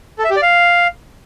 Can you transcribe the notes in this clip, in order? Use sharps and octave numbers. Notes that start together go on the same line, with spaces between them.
A4
E5
G4
D5
F5